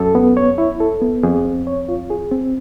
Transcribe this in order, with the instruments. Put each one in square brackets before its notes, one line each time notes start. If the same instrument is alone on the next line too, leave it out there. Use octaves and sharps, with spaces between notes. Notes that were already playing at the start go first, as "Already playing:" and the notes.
Already playing: [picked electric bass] F#2 [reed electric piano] A4
[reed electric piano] B3
C#5
E4
A4
B3
[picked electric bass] F2 [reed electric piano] G#4
[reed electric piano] C4
C#5
F4
G#4
C4